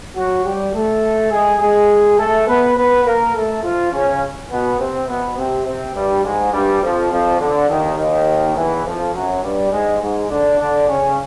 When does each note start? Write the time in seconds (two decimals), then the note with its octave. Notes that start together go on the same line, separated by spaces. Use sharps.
0.16 F#3 F#4
0.45 G3 G4
0.73 A3 A4
1.32 G#3 G#4
1.60 G#3 G#4
2.18 A3 A4
2.48 B3 B4
2.77 B3 B4
3.05 A#3 A#4
3.34 A3 A4
3.63 F3 F4
3.92 C#3 C#4
4.51 B2 B3
4.79 C3 C4
5.08 B2 B3
5.37 C3 C4
5.66 C3 C4
5.95 G2 G3
6.24 G#2 G#3
6.53 G2 G3
6.82 F2 F3
7.11 F2 F3
7.40 D3
7.69 D#2 D#3
7.98 D#2 D#3
8.56 E2 E3
8.85 F2 F3
9.14 F#2 F#3
9.43 G2 G3
9.72 G#2 G#3
10.01 G#2 G#3
10.30 D3 D4
10.59 D3 D4
10.88 C#3 C#4